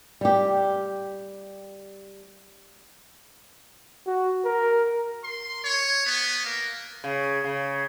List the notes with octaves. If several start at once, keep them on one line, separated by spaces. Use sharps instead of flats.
G3 G4
F#4
A#4
C6
C#5
B3
A#3
C#3
C#3